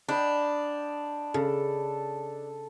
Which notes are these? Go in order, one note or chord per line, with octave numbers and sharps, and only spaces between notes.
D4 D#5 G5 B5
C#3 A4